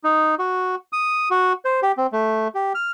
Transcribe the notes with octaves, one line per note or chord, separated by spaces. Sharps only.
D#4
F#4
D#6
F#4
C5
G4
C4
A3
G4
F6